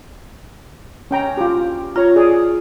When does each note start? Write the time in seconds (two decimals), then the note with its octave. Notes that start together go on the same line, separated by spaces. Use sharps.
1.11 C#4 G5 A#5
1.37 F4 G4
1.96 F4 C#5 A#5
2.16 G#4 D5